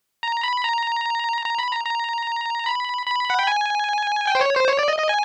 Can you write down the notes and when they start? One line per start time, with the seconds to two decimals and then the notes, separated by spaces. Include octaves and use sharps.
0.23 A#5
0.43 B5
0.64 A#5
1.45 A#5
1.59 B5
1.71 A#5
1.86 A#5
2.66 B5
3.06 B5
3.30 F#5
3.39 G5
3.47 G#5
4.27 G5
4.35 C5
4.41 C#5
4.56 C5
4.68 C#5
4.79 D5
4.88 D#5
4.99 D#5
5.09 G#5